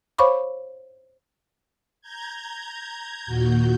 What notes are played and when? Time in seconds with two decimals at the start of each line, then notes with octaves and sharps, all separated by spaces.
0.18 C5 C#5 F5 B5 C#6 D6
2.01 A#5 G6 G#6
3.26 D#2 A#2 F#4 G6